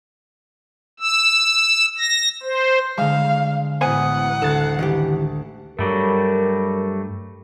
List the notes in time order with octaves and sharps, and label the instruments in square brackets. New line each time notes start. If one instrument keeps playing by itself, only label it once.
[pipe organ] E6
A#6
C5
[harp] D3 G#3 [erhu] F5
[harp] A1 D#6 [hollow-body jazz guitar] B3 C5 G#5 [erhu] F#5
[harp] D2 A6 C7 [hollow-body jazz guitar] A4
[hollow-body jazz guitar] D#3 E3 G4
[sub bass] G2 [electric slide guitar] F#3 G3 A3 [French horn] A#4